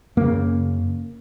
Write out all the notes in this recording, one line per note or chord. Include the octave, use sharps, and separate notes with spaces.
F#2 C#3 A#3